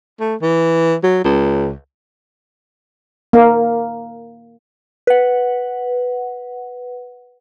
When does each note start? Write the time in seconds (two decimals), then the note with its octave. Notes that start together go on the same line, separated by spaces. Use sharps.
0.20 A3
0.41 E3
1.03 F#3
1.25 C#2
3.33 A#3
5.07 B4 F#5